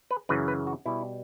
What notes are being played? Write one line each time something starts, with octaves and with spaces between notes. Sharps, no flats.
B4
F#2 C#3 E3 B4
B4
F#4
B2 G3 E4